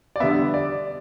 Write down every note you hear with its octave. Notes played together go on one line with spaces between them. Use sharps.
D5
D3 G3 B3 E5
D5